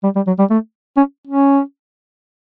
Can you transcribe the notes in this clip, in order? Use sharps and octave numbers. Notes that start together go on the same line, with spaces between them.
G3
G3
F#3
G3
A3
C#4
C#4